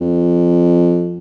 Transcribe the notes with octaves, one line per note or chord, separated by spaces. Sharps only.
F2